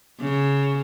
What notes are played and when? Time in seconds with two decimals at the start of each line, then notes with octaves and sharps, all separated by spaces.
0.21 C#3